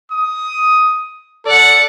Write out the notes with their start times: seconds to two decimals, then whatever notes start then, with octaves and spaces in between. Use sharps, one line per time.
0.11 D#6
1.46 A4 D5 F#5